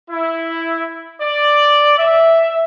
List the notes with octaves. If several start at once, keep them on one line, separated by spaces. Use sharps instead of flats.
E4
D5
E5